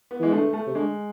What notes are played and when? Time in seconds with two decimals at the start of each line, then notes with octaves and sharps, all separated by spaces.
0.11 B3
0.20 E3 G#3
0.32 D3 A3
0.53 A3
0.67 C3
0.75 D3 G#3